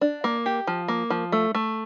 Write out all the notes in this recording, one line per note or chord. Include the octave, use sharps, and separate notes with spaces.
D4
A#3
G4
F3
A#3
F3
A3
A3